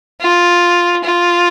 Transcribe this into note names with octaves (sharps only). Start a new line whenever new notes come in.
F4
F4